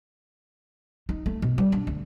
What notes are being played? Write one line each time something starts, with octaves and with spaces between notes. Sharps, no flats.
D#4
A3
B2
G3
D4
D2